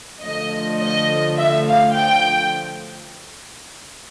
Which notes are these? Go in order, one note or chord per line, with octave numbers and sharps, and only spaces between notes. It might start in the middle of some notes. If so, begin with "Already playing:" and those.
D3 F3 A3 D#5
D#5
E5
F5
G5